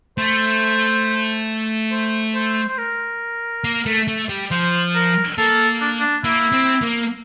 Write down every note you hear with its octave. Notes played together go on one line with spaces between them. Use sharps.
A3 C5
C5
C5
C5
A#4
A#3
A3
A3
G3
F3 C5
A#4
A#3 A4
D4
D4
A#3 E4
C4
A#3